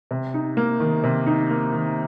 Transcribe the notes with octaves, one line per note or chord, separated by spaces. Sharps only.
C3
D#4
A#3
D#3
C3
D#4
A#3
D#3